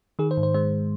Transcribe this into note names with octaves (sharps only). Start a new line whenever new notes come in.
D#3 G#4
C5
G#2
C5
G#3 C5